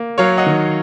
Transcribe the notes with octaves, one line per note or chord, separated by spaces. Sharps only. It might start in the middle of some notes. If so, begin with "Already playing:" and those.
Already playing: A#3
F#3 C#5 F5
D#5 F#5
D#3